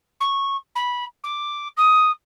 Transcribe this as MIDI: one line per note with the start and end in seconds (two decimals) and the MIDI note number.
0.20 0.57 85
0.75 1.04 83
1.23 1.68 86
1.77 2.11 87